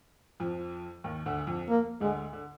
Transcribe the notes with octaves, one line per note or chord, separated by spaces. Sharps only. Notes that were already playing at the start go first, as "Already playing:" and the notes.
F2 F3
D#2 D#3
D2 D3
F2 F3
A#3
D2 D3 G#3
D3